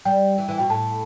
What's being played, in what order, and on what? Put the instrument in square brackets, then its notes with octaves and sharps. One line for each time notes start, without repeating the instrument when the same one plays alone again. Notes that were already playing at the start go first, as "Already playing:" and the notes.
[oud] G3 [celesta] G5
[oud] E3
E3
[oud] B2 [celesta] G5
[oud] A2 [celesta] A5